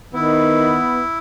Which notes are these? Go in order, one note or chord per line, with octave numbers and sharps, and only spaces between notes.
D#3 B3 E4